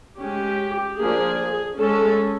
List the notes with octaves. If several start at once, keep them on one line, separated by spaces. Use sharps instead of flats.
G#3 C#4 G4
F3 A#3 D4 G#4
G#3 C#4 A4